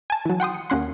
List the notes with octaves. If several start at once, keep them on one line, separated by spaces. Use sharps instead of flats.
G#5 A5
E3 F#3
F#5 G5 C6 D#6
C#7
D#2 A#3 C#4 F#5 C6